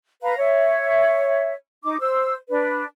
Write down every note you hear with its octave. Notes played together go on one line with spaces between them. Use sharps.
B4 F5 A#5
C#5 E5
D#4 D6
C5 E6
D4 B4